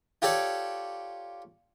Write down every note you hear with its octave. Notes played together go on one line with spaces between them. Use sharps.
F4 G4 A4 C#5 D5